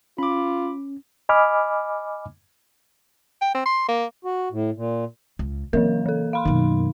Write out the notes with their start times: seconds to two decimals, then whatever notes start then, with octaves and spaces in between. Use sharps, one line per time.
0.18 C#4 F4 B5 D6
1.29 D#5 G#5 B5 D6 F6
3.42 G5
3.55 C4
3.66 C6
3.89 A#3
4.25 F#4
4.52 A2
4.76 A#2
5.39 C#2
5.73 C#3 E3 F#3 A#3 A#4
6.06 E3 A4
6.33 F5 B5 C6
6.45 F#2 B2 D#3